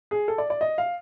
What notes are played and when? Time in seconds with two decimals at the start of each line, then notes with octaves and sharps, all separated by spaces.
0.11 G#4
0.28 A4
0.38 D5
0.50 D5
0.61 D#5
0.78 F5